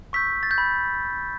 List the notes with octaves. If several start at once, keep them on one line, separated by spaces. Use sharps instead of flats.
C#6 E6 G6 B6
A6
G6
B5